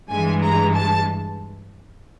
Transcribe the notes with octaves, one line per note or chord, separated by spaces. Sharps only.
G2 E3 G#3 G#5
A#5
A5